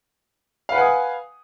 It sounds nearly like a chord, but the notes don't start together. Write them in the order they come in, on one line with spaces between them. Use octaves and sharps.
F5 B4 F#5 G#5 D#6